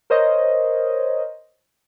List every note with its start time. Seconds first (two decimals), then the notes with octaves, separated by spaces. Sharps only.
0.10 A#4 C5 C#5 D#5